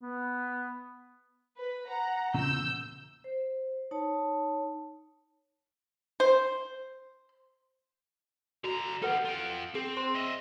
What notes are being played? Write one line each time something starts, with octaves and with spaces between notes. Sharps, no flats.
B3
B4
F#5 A#5
E2 A#2 C#3 E6 G6
C5
D#4 C#5 A5
C5
D3 F#4 A#5
D#4 G4 A4 B4 F#5
F4 G5
C4 G#4
C5 C6
D#5 E5